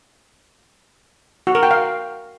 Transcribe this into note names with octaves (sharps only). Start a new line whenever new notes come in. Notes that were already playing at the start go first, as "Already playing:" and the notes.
F#4
A#4
G5
F5